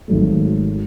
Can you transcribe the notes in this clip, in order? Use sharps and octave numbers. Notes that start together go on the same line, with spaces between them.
G#1 G#2 F#3 A3